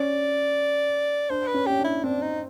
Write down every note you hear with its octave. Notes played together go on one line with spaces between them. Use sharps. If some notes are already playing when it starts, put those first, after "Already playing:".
Already playing: C#4 D5
D4 C5
B4
C#4
C#4 G4
D4 E4
C4 D4
D#4